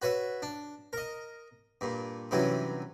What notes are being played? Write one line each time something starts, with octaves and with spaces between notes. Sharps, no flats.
F#4 B4 C#5 E5
D4
A#4 D#5
G2 A#2
G2 C3 E3 F#3 C#4